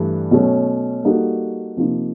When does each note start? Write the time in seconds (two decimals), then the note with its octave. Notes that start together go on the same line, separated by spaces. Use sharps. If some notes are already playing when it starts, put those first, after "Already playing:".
Already playing: G2 E3 A3
0.31 B2 F#3 A3 C#4
1.04 G3 A#3 D#4 F#4 A4
1.76 C3 F3 A#3 D#4